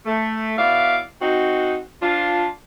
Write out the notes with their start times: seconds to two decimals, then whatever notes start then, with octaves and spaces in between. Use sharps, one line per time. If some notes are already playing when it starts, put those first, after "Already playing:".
0.06 A3
0.58 B2 E4 D5 F5
1.21 C4 D#4 F#4
2.01 F3 D4 F4